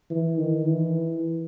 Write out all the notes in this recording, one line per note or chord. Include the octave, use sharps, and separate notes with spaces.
E3
D#3
E3